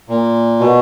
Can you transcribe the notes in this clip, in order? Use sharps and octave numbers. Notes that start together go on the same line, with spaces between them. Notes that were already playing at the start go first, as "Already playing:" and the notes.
A#2
B2